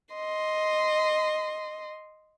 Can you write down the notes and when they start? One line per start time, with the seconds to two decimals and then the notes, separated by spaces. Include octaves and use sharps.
0.15 D#5 C6